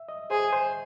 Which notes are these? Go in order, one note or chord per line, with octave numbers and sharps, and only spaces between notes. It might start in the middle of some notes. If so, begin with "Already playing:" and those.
Already playing: E5
D#5
G#4 C5
C5